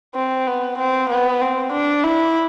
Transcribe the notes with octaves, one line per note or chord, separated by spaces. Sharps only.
C4
B3
C4
B3
C4
D4
E4